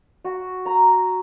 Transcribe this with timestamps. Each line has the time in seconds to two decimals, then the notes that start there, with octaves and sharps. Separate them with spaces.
0.25 F#4
0.66 A#5